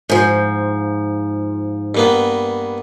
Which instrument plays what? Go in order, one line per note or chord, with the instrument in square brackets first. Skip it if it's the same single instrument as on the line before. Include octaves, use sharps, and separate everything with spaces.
[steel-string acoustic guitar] G#2 F3
[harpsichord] G2 A#3 B3